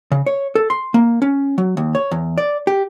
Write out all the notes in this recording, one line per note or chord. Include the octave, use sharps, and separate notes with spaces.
C#3
C#5
A4
C6
A#3
C#4
F#3
D#2
C#5
E2
D5
G4